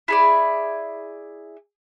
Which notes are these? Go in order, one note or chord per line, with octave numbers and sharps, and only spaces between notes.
E4 G#4 D5